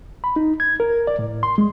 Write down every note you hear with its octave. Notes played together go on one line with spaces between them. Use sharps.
B5
D#4
G#6
A#4
D5
A2
C6
G#3